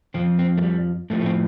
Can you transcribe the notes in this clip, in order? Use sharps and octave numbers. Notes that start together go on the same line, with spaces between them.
F2 F3 C4
C4
A3
G3
A2 F3 A3
A3
C4